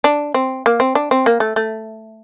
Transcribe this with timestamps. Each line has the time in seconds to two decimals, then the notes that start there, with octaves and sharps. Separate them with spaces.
0.04 D4
0.34 C4
0.66 A#3
0.80 C4
0.95 D4
1.11 C4
1.26 A#3
1.40 A3
1.56 A3